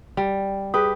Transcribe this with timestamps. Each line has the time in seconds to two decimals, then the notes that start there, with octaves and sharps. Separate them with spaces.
0.17 G3
0.74 G4 G#4 B4 D#6